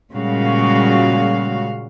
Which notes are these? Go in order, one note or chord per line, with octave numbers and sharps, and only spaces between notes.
A#2 C#3 G3 G#3 F#4 F5